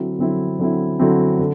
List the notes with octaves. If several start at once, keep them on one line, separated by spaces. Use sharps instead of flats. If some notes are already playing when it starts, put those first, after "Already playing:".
Already playing: D3 F#3 C4 E4
D3 F#3 C4 E4
D3 F#3 C4 E4
D3 F#3 C4 E4
D3